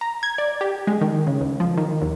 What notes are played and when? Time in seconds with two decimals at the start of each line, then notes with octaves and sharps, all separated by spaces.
0.01 A#5
0.23 G#6
0.38 D5
0.61 G4
0.87 G#3
1.01 D#3
1.27 C#3
1.41 C#2
1.60 F3
1.77 D#3
2.02 D#2